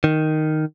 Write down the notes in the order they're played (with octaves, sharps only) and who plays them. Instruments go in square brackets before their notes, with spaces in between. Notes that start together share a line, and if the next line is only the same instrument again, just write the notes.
[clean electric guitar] D#3